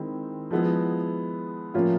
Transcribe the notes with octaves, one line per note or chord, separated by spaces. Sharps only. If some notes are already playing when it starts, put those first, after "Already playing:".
Already playing: D#3 G#3 C4 E4
F3 G#3 B3 E4
A2 F3 A#3 C#4 F4